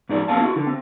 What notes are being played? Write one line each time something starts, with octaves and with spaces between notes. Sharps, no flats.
G#2 D#4 D5
A#3 B3 C#4 F5 A5
E4 F#4
D3
C4